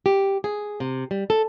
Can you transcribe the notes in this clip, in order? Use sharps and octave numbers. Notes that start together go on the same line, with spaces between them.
G4
G#4
C3
G3
A4